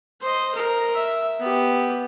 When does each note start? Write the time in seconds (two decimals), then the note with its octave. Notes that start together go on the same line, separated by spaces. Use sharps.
0.21 C5 D#5
0.54 A#4
0.94 E5
1.40 B3 G4